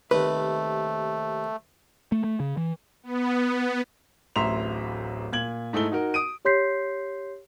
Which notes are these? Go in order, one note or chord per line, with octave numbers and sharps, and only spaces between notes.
D#2 C3 A3 B4
A3
A3
C#3
E3
B3
D1 A1 E5 A#5 C6 F7
A#2 G#6 F#7
G#2 A3 D#4 E4 G7
D#4 F#4 A#4
D#6 D7 D#7
G4 C#5 C6 G6 B6 C7